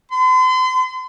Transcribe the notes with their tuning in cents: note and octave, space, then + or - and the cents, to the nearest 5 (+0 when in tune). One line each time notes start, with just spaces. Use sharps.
C6 -40